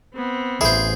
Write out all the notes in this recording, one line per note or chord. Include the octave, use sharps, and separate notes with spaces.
B3 C4
A1 E4 G#4 C5